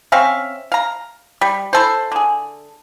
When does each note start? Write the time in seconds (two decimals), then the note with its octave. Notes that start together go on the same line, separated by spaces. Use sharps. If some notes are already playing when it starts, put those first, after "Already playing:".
0.12 C4 C#4 E5 F5
0.72 F5 A#5
1.41 G3
1.73 E4 A4 C5
2.12 D3 G#4